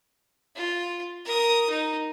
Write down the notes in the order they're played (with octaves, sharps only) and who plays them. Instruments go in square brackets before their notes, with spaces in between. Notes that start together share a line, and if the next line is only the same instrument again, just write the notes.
[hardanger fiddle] F4
A#4 D#6
D#4